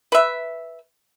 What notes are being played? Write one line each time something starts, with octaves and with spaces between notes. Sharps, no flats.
B4 E5